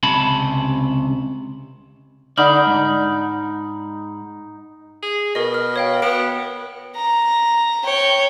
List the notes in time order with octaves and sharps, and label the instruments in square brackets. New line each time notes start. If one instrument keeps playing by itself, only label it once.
[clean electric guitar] C#2 C3 C#4 A5 B5
[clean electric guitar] D3 D5 [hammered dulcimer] D#4 [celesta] F#5 B5 F6
[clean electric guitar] G#2
[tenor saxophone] G#4
[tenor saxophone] B2 [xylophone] A#4 D#5
[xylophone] F6
C#5 F5 G5
[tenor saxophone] B3 [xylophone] D7
[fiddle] A#5
C#5 G5